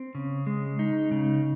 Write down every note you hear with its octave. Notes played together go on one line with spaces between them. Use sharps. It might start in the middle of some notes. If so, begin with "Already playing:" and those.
Already playing: C4
C#3
G#3
D#4
C#3